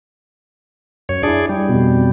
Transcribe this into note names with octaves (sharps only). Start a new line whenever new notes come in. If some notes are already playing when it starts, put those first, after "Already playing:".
F#2 C#5
D4 E4 G#4 D5
G3
F2 B2